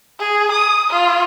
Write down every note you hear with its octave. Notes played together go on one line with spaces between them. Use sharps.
G#4
D#6
F4